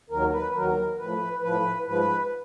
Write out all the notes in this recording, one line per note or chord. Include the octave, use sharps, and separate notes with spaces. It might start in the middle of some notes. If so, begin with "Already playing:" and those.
D#2 D#3 F#3 A#4
B4
D#2 D#3 F#3 A#4
A2 F3 B4
A2 F3 B4
G#2 F3 B4